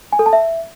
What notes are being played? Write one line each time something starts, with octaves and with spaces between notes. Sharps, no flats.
G#5
A4
A5
E5